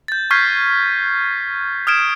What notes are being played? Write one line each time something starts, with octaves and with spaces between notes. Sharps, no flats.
G6 A6
C#6 F6 G6 G#6 B6 C7
D#6 F6 G#6 D7 E7